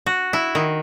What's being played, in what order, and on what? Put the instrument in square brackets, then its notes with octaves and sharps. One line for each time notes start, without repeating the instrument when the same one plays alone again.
[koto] F#4
E4
D#3